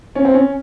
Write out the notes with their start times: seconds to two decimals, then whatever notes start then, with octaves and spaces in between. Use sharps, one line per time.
0.15 C#4
0.25 C4
0.34 C#4